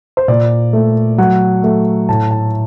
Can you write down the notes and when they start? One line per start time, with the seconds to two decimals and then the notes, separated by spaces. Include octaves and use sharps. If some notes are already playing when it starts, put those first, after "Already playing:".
0.17 C5
0.28 A#2 D5
0.73 A3
1.18 F#3 F#5
1.63 A3
2.09 A2 A5
2.31 A5